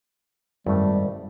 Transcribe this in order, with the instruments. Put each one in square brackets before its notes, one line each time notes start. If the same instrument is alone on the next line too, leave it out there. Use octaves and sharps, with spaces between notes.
[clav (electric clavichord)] G#1 A3 [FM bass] F#2 [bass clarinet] G3